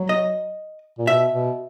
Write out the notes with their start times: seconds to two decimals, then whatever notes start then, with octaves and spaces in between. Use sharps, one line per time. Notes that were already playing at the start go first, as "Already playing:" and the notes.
Already playing: F#3
0.09 D#5
0.98 A#2
1.07 B2 E5
1.32 B2